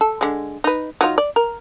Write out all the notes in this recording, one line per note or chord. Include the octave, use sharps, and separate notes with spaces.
A4
D3 G#3
D#4 B4
F#3 D#4 F4
D5
A#4